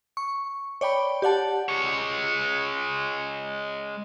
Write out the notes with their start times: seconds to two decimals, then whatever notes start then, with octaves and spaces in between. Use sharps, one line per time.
0.17 C#6
0.81 C#5 D5 G5 B5
1.22 G4 D5 F#5 A5
1.69 G#3 C#5